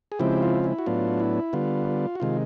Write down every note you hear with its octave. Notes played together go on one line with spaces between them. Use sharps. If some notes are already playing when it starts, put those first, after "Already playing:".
G#4
C#3 F3 G#3 C4 E4 G4
F4
E4
F#4
A2 F#3 B3 D4 F4
E4
D3 G3 B3 F4
F#4
C3 D#3 G#3 F4